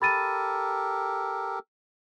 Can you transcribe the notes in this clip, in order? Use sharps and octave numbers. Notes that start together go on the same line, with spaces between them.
G4 A4 A#4 B5 A6 D#7